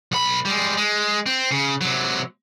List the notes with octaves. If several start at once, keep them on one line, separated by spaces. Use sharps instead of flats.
B1 B5
G3 G#3
G#3
C4
C#3
C3 F#3